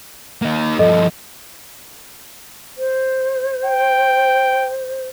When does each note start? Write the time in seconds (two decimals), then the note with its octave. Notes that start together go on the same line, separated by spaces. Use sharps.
0.42 A#3 D#4
0.79 G2 F3 A4 D#5
2.78 C5
3.65 G5